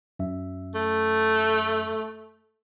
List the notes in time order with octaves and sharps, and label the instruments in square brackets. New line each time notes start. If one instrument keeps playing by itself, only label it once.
[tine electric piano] F#2 E5
[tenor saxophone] A3